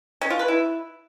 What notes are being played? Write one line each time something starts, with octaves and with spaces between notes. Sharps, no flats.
C#4
F4
B4
E4